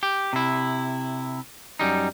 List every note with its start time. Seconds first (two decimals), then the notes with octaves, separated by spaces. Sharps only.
0.03 G4
0.33 C3 E4
1.79 F#2 G3 D#4